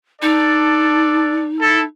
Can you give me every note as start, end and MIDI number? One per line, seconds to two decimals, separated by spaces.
0.22 1.47 62
0.22 1.84 63
0.22 1.47 69
0.22 1.47 74
1.60 1.82 64
1.60 1.82 69